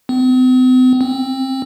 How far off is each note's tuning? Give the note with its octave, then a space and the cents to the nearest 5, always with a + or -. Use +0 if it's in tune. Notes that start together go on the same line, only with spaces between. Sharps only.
C4 -45
C4 +20